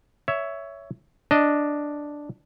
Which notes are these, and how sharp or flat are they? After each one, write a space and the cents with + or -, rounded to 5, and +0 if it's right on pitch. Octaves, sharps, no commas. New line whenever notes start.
C#5 +15 E5 +5
D4 +0 D#5 +0